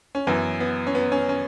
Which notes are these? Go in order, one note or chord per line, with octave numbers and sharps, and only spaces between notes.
C#4
F#2 E3 B3
B3
C#4
B3
C#4
C#4